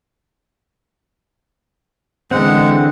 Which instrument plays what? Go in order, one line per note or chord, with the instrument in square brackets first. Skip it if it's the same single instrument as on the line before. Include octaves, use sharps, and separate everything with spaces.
[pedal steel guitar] D3 E3 C4 [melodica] G#3 F#5